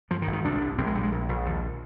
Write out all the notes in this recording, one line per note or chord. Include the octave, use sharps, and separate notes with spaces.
G2 F3
D#3
G#1
D#3
C2 D4
C2
A#1 C4
G#3
A#1 G3
G#3
A#1
A#1
D#2